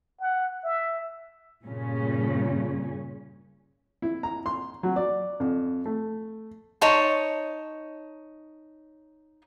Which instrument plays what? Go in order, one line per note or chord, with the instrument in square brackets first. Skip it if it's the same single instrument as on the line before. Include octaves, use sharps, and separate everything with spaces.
[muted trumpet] F#5
E5
[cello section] G2 A#2 C#3 C#4
[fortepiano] E4
A#5
C6
F#3
D5
F2
A3
[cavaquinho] D#4 C#5 A5 C6